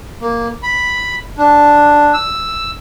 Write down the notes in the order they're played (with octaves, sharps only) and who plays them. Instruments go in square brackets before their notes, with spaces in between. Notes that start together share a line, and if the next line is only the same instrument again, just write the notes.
[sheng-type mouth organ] A#3
B5
D4
E6